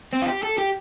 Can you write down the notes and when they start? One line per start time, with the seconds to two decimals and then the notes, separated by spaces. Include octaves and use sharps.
0.13 C4
0.22 F4
0.28 G4
0.43 A4
0.58 G4